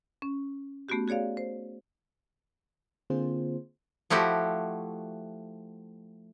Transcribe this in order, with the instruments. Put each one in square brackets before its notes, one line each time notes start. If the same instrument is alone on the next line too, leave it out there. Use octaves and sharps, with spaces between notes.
[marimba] C#4
A3 B3 C#4 F#4 G4
F#4 G#4 C#5 D5 F5
C5
[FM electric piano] D3 A#3 C4 F4 G#4 C5
[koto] F3 A3 E4 F#4 G4